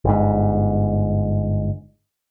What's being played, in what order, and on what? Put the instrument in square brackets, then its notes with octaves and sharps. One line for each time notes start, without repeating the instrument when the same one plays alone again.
[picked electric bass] G1 G#2